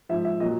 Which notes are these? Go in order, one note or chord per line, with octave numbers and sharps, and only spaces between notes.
G#2 F3 E5
E5
A#2 F#3 D#5